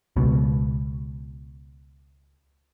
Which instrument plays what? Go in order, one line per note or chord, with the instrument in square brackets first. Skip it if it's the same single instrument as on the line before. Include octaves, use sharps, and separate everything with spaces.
[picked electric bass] C#2 B2